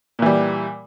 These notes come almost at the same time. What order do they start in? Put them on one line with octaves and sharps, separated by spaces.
A#2 E3 G3